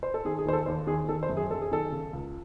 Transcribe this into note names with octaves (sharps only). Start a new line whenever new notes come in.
C5
A4
D#3 G#4
G#4
D#2 C5
A4
D#2 C5
D#3 G#4
D#3 A4
C5
F#2
G#4
F#2 A4
G#4
D#3 A4
C#3
C#2